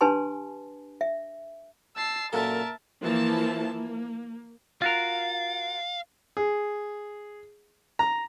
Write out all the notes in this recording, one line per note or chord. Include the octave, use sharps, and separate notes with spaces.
D4 G4 B4 G#5 A5 C6
E5
A5 E6 C7
F#2 A#2 A4 A#4 E5 A5
E3 F3 A#3 E4 A5
A#3
F4 F#4 A#4 F5
G#4
A#5